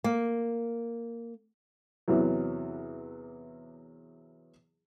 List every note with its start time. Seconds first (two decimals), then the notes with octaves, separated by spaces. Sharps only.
0.04 A#3
2.08 E2 C3 E3 F#3